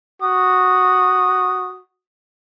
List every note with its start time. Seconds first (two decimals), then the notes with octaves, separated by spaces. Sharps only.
0.22 F#4 D#6